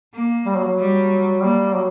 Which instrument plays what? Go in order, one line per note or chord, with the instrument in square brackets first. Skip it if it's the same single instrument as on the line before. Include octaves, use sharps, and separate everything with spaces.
[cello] A#3
[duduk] G3
F#3
F#3
[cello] G3
[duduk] G3 [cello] A#3
[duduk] F#3